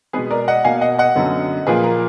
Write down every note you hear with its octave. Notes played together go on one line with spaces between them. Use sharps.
B2 G#3 B3 G#4 B4
A#4 D5
D#5 F#5
B2 A#3 F5 G#5
D#5 F#5
D#5 F#5
F#2 D3 F#3 B3
A#2 F3 A#3 G#4 B4
A#4